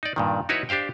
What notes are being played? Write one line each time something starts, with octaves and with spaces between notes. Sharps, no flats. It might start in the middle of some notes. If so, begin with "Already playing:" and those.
D#4 D5
G2 A#2 D#3
D#4 E4 F#4 B4 C#5
D4 G4 C5 F5 G5